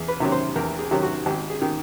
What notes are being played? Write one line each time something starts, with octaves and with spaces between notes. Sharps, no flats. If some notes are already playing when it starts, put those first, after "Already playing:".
Already playing: E2 G#4
B4
C3 D#3 F#3
C5
E2 A#4
G#4
C3 D#3 F#3
F#4
G#1 G4
G#4
D#3